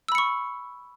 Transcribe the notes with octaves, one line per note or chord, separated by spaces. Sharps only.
B5 C#6 E6 C#7